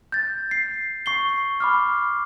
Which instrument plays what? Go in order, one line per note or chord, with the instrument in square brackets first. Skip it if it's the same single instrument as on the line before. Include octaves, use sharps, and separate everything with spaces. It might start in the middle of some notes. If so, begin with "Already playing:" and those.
[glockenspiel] G6 A6
C7
C#6 C7 G7
B5 D6 F6